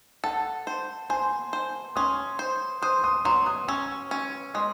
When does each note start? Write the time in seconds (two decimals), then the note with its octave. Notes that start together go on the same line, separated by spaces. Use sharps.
0.24 A4 F#5 A5
0.67 C5
1.10 C5 G#5 C6
1.53 C5
1.96 C#4 C6 D#6
2.39 C5
2.82 C5 C6 D#6
3.04 C6 D#6
3.25 F#3 C6 D#6
3.46 C6 D#6
3.68 C#4 C#6 E6
4.11 C#4
4.54 G#3 C6 D#6